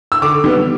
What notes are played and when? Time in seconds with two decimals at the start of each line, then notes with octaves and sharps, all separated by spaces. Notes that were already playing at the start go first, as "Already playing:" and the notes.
0.12 E6
0.22 D3 D6
0.44 G3 B3